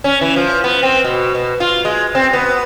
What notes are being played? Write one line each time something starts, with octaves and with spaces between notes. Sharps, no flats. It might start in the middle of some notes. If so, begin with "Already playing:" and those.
C#4
E3
F3
B3
C4
B2
B2
F4
G#3
C4
B3